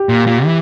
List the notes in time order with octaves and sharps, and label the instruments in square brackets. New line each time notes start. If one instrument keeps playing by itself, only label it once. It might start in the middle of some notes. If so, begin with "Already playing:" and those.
Already playing: [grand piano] G4
[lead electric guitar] A#2
A#2
E3